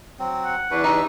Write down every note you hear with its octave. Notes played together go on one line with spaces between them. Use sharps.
F#3 C4
F#5
E2 D4 E4 F#4 B4
D#4 G4 C#6 E6